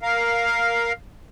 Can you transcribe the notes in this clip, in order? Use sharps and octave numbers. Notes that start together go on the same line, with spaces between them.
A#4 F5